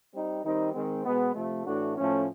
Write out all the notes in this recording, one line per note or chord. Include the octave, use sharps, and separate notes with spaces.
G3 C4 D#4
D#3 G3 C4 D#4
D#3 G#3 C4
B2 G#3 B3
C3 F3 A3
A2 E3 A3 D4 F#4
A2 F3 A3 C#4